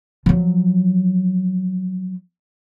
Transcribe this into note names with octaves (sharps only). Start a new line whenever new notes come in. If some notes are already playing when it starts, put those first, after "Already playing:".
F3 F#3